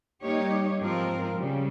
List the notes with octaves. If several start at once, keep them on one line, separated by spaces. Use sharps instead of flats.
G3 A#3 D#4 G4 C#5
G#2 F3 C4 F4 A#4
C#3 G3